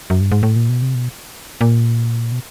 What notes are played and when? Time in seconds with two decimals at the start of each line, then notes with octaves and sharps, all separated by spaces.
0.10 F#2
0.21 G2
0.32 G#2
0.43 A2
0.56 A#2
0.69 B2
0.82 C3
0.95 B2
1.61 A#2
2.32 B2